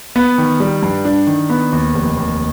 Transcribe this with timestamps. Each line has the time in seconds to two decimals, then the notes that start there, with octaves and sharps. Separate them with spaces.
0.16 B3
0.38 D#3
0.60 G3
0.83 G2
1.05 D4
1.27 D#3
1.50 B3
1.72 D#2
1.94 F1
2.17 D#2